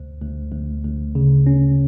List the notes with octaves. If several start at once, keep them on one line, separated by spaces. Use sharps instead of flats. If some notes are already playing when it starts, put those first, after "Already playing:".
Already playing: D2
D2
D2
D2
C#3
C#4